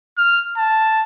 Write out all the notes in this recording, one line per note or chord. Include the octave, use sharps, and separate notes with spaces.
F6
A5